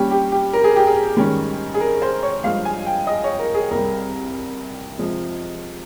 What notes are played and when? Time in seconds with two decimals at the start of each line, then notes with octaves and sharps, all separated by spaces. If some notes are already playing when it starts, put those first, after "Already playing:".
Already playing: A#2 G3 C#4 G4
0.11 G4
0.32 G4
0.53 A#4
0.64 G#4
0.76 G4
0.87 G#4
1.17 G#2 D#3 G3 C#4
1.74 G#4
1.80 A#4
2.02 C5
2.23 C#5
2.44 G2 F3 G#3 F5
2.65 G#5
2.86 G5
3.07 D#5
3.24 C#5
3.39 A#4
3.54 G#4
3.71 C2 C3 G3 A#4
4.98 C3 F3 G#3